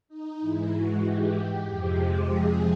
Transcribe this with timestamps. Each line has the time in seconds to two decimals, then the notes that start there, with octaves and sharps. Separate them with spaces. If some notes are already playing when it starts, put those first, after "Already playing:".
0.08 D#4
0.40 G#2 E3 G#3 E4
0.72 F#4
1.03 G4
1.66 F2 C3 F3 G#3
2.29 G#4